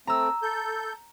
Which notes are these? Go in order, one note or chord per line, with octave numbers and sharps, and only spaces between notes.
A3 C4 A#5 E6
A4 G6